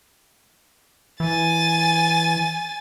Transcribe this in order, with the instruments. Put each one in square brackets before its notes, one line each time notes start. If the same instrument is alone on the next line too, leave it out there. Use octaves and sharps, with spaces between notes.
[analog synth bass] E3 [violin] G#5 A6